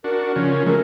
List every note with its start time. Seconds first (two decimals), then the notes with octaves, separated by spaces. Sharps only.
0.04 D4 F#4 A#4
0.36 C#3 F3 C#4
0.66 F#3 G#3 A3 A#4